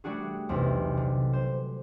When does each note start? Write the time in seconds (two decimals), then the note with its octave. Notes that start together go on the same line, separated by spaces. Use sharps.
0.04 G3 A3 D4 F#4 G#4
0.49 B1 E2 C3
0.97 D3
1.33 C5